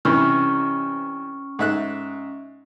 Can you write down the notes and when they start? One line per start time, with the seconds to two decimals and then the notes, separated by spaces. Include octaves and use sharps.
0.05 G2 C3 E3 C#4 C#6 F6
1.59 G#2 E5 F#6